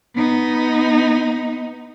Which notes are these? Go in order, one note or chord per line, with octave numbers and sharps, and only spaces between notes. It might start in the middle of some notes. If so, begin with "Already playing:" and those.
B3 D#4